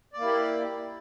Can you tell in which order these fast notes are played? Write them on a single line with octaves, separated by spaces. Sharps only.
D5 A#3 E4 G4